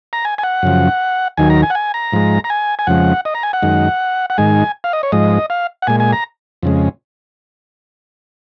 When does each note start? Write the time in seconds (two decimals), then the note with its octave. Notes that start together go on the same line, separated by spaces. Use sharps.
0.13 A#5
0.25 G#5
0.38 G#5
0.43 F#5
0.63 F#2 C#3 F3
1.37 D#2 D#3 F#3 G#5
1.50 A#5
1.62 G#5
1.70 F#5
1.75 G#5
1.94 A#5
2.13 G#2 F3 G#3
2.44 A#5
2.50 G#5
2.79 G#5
2.87 F2 C#3 F3 G#3 F#5
3.25 D#5
3.35 A#5
3.43 G#5
3.53 F#5
3.62 F#2 D#3 G#3
4.30 F#5
4.38 G#2 D#3 G#3 G#5
4.84 F5
4.93 D#5
5.03 C#5
5.12 G#2 F3 G#3 D#5
5.50 F5
5.82 F#5
5.87 A#2 G#3 G#5
6.00 G#5
6.13 A#5
6.63 F2 C#3 G#3